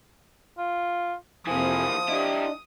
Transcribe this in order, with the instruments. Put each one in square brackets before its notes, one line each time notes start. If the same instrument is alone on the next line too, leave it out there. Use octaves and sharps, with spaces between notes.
[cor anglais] F4
[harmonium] F2 C3 G#5 [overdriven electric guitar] E3 A#3 [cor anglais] F3 [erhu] D#6
[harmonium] D4 D#5 [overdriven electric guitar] E4 G4